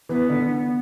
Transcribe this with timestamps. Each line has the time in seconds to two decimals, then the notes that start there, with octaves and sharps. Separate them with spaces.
0.09 E3 B3
0.29 D3